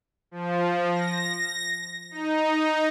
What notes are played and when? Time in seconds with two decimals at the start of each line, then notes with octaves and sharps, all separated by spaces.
0.31 F3
0.91 A#6
2.11 D#4